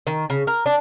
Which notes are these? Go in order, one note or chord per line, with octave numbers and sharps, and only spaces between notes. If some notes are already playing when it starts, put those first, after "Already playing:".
D#3
C#3
A#4
D4